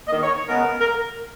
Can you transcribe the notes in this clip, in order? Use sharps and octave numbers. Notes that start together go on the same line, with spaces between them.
D#3 A#3 D#5
C#5
C#3 G#3 B3 A#4
A#4